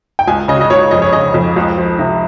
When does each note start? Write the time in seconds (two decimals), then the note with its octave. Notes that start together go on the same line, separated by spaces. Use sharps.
0.19 G5
0.28 C#2 G#5
0.48 C#3 D#5
0.61 D#5
0.70 C#2 C#5
0.91 F2 D#5
1.02 C#5
1.13 C#3 D#5
1.34 F2
1.56 C#2
1.78 F3
1.99 C3